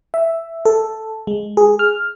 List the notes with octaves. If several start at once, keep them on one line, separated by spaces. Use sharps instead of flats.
E5
A4
G#3
G#4
F6